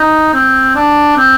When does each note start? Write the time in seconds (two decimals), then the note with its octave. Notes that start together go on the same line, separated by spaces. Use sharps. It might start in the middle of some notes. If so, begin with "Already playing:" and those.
Already playing: D#4
0.34 C4
0.75 D4
1.17 C4